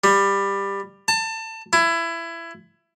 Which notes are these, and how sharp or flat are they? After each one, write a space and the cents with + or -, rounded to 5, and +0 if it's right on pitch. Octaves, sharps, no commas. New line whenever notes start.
G3 +15
A5 +25
E4 +20